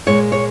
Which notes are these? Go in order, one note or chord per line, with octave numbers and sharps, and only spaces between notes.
A#2 G#3 C#5
C#5